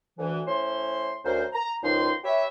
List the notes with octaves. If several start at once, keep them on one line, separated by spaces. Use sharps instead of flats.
D2 E3
A2 C#4 C5 C6
D2 C#4 A#4 C5
A#5
C#2 D#3 F3 D#4 C6
G4 B4 C#5 E5